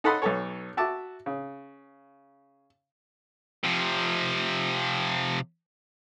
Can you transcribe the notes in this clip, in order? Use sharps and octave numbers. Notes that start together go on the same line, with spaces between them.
D#4 A4 F#5 B5 C6 D#6
B1 B3 A4 C#5
F#4 E5 A5 D6
C#3
C3 F3